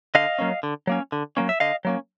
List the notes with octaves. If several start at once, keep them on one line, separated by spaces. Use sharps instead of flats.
D3 D#5 F5
F#3 A#3 C#4
D3
F#3 A#3 C#4
D3
F#3 A#3 C#4
E5
D3 D#5 F5
F#3 A#3 C#4